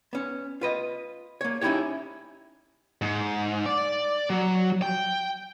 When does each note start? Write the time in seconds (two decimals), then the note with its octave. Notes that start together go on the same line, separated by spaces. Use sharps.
0.13 B3 C#4
0.61 F4 B4 D#5
1.41 A#3 C#5
1.61 C#4 D#4 E4 F#4 G4 C#5
3.02 G#2
3.66 D5
4.30 F#3
4.82 G5